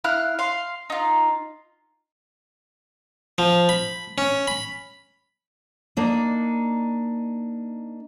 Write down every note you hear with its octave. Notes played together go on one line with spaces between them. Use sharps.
E4 F5 F6 F#6
F5 C6
D#4 F4
F3
B5
C#4
B5
A#3 D4 D#4